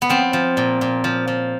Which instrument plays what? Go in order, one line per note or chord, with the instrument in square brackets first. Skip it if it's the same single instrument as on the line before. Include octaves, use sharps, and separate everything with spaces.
[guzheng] B3
F3 C4
F3
A#2
A#2
F3
F3